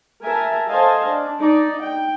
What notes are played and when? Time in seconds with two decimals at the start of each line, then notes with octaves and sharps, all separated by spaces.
0.24 A#4 E5 G#5 A5
0.68 A4 C5 D#5 F5 G#5 A5
1.06 D4
1.39 D#4 D5
1.81 G5